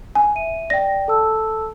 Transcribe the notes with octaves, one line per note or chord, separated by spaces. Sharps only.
G#5
E5 D#7
D5 G5 A#6
A4 A5 E6